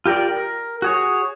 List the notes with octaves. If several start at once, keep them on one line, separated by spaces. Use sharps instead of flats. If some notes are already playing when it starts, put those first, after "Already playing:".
F4 G4 A#4 D5 G5
A#4
F#4 G#4 C#5